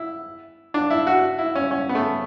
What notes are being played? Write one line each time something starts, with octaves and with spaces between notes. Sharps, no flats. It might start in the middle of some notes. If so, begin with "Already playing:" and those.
Already playing: E4
D4
E4
F#4
E4
C#4
C#4
B3
A3